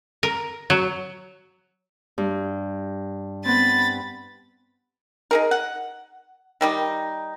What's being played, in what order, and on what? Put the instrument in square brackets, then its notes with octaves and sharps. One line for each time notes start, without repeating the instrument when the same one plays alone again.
[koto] A#4
F#3
[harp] G2
[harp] B3 C4 [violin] B5 A6
[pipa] D#4 G#4 A#4
F#5
D#3 G3 D#4